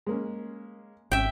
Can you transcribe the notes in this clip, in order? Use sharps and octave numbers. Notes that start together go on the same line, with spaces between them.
G#3 A#3 C#4
G#1 C#4 E5 G5